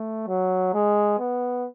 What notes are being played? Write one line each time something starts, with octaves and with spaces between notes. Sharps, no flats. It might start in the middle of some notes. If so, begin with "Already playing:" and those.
Already playing: A3
F#3
G#3
B3